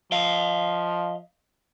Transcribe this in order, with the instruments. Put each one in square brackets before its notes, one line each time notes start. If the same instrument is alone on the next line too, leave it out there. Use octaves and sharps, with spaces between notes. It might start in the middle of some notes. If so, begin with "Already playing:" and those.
[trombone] F3 [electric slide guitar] D#5 F5